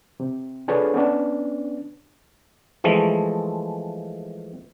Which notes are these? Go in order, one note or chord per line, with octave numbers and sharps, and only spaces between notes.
C3
D4 F4 G#4 A4 B4 C#5
B3 C#4 D4
E3 F3 G#3 A3